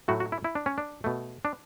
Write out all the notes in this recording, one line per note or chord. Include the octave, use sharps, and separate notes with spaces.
A2 F#3 A3 F#4
F#4
E4
E4
D4
C#4
D4
B2 A3
D4